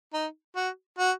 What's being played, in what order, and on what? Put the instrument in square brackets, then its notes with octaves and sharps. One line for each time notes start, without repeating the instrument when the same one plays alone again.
[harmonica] D#4
F#4
F#4